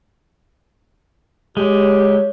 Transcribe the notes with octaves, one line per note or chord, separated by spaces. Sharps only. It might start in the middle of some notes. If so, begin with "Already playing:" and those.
G#3 G4 C#5